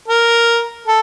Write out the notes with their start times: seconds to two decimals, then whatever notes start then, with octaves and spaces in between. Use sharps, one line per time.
0.08 A#4
0.87 A4